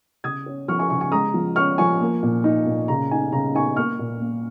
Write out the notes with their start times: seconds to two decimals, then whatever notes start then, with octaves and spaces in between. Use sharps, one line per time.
0.24 C#3 D#6 G#6
0.46 C#4
0.68 F3 C#6 F6
0.79 G#5 C#6
0.90 C#3 G#5 C#6
1.01 G#5 C#6
1.12 G#3 A#5 D#6
1.34 F3
1.56 C#4 C#6 F6
1.78 F3 G#5 C#6
2.01 A#3
2.23 A#2
2.44 D#4
2.66 A#2
2.88 C#3 A#5
3.11 D#4 G#5
3.32 C#3 A#5
3.55 D#4 G#5 C#6
3.76 A#3 C#6 F6
3.99 A#2
4.21 A#3